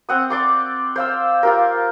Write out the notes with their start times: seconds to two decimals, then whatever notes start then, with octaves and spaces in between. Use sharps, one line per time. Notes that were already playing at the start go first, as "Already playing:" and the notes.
0.09 C4 F#5 D#6
0.30 D5 C6 D6
0.96 C5 F5 E6
1.43 F4 G4 A#4